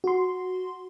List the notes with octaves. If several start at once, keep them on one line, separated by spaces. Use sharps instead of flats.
F#4 C6